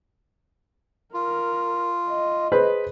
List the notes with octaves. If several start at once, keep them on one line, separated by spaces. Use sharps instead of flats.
F4 A#4
D#5
G#4 B4 C5